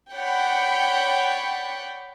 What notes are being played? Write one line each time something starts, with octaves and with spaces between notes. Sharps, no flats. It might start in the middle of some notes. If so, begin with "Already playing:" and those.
C#5 D5 F#5 G5 B5